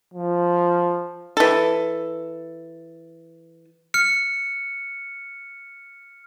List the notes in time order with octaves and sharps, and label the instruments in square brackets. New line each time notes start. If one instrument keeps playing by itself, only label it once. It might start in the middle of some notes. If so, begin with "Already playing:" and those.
[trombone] F3
[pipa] E3 A4
[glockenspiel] F6 C#7